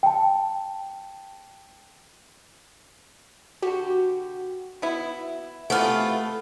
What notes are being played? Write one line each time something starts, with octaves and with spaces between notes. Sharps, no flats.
G5 A5
D3 F#4 G4
B3 E4
C3 E3 A3 B3 F4 F#5 F6